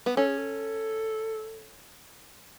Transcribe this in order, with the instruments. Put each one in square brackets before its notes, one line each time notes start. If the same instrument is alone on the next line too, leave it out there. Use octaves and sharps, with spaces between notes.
[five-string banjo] B3
[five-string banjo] C#4 [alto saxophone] A4
[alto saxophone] G#4
A4